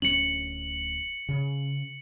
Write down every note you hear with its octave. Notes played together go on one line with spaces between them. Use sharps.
D1 F#3 C#4 C#7 F#7
C#3